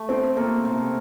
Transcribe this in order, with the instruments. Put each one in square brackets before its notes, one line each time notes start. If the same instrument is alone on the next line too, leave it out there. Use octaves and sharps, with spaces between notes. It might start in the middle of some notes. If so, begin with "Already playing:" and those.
Already playing: [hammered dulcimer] A3 G4
[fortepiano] C4 [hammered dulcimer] A4
[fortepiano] A#3 [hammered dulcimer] A4
[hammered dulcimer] C3